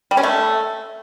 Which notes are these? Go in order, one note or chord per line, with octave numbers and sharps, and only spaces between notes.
G3
C#4
A3